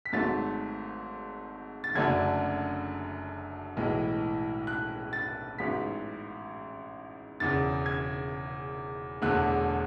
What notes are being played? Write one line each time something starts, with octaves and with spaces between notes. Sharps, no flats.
B6
G#1 G#2 F#3 A3 A6
A6
F#1 F#2 D3 A3 D4 G#6
B1 A2 E3 G#3
F#6
A6
A1 G#2 F#3 B3 B6
E1 E2 C#3 A6
G#6
E1 E2 D3 A3 F#6